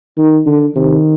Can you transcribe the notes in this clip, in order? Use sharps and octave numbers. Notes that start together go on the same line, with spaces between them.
D#3
D3
C3 D#3